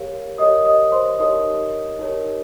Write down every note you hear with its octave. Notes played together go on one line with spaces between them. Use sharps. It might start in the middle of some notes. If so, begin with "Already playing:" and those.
Already playing: G4 A#4 C#5 F5
G4 A#4 C#5 D#5 D#6
D#5 D#6
C5 C6
D#4 G4 A#4 C#5 D#5 D#6
D#4 G4 A#4 C#5